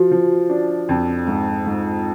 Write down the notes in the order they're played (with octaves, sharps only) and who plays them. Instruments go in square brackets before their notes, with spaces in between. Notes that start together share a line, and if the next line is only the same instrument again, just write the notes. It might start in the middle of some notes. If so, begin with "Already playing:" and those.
Already playing: [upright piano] F3 [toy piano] F#4
[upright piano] F3
D4
F2
G#2
G#2